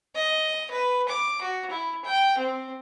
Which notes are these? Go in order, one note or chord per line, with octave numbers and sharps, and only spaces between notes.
D#5
B4
D6
F#4
E4
G5
C4